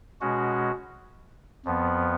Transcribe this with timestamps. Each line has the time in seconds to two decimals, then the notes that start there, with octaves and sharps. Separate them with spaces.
0.21 B2 G#3 C#4 F#4
1.65 F2 F3 B3